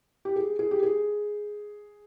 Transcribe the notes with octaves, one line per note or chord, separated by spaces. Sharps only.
G4
G#4
G#4
G4
G#4